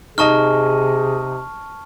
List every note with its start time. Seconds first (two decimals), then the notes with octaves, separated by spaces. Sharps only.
0.18 C3 D#4 G#4 D#5 A5 C#6 F6